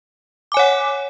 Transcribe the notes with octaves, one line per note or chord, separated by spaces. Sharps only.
C#5 F#5 G#5 D6